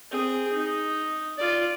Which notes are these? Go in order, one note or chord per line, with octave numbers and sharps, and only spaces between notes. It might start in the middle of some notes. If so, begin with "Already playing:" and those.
C4 G#4
D#4
F4 D5